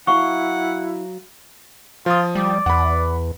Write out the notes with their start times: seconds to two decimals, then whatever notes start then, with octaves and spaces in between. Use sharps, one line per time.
0.07 F#3 E4 F5 F#5 A#5 C#6
2.06 F3 F4 D#6
2.35 G3 D5
2.66 E2 F#5 B5